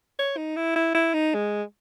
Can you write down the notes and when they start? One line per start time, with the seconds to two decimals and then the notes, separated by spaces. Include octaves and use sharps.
0.19 C#5
0.37 D#4
0.56 E4
0.76 E4
0.95 E4
1.14 D#4
1.34 G#3